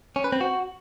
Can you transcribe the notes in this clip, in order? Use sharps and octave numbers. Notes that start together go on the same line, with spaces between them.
C#4
B4
C4
F#4